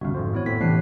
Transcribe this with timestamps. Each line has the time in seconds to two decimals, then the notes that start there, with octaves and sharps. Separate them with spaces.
0.01 G1 C#2 F#4 F5
0.14 G#1 F2 C5
0.33 B3 E4 C#5
0.46 A2 C4 B6
0.61 A2 C3 E3 D4 G5 F#6 C7